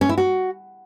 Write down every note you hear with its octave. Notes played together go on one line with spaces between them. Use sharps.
C#4
E4
F#4